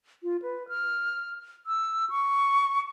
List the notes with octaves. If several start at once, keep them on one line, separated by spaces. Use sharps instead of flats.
F4
B4
F6
E6
C#6